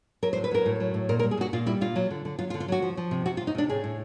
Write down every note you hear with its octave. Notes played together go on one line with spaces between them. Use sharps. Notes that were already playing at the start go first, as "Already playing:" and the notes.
F#3 A#4
C5
A2
B4
F#3 A#4
A2
F#3
A2
A#2 A#4
A#4
G3
G#4
A#2 F#4
A#2 F4
G3 E4
A#2 F4
F#3
D3
D3
F#3 F4
F4
D3
F4
F#3 F#4
F3
F3
C3
C3 F#4
F4
C3
D#4
C3 D4
A2 G#4
A2